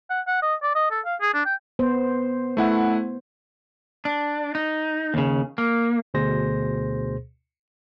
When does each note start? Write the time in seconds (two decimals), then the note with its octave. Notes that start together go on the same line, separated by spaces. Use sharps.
0.10 F#5
0.27 F#5
0.42 D#5
0.63 D5
0.75 D#5
0.91 A4
1.06 F5
1.21 G#4
1.34 D4
1.46 G5
1.79 B3 C5
2.57 A3 E4 F#5
4.05 D4
4.55 D#4
5.14 D#2 C#3
5.58 A#3
6.14 D2 B2 G#4 C5 A#6